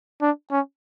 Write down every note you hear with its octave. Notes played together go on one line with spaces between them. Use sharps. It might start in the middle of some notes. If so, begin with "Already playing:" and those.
D4
C#4